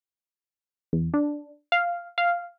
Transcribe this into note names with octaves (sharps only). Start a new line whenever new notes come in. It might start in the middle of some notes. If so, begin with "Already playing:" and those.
E2
D4
F5
F5